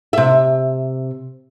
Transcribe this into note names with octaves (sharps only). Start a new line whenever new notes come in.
C3 E5